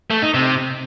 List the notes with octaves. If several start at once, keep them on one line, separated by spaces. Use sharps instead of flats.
A3
D#4
C3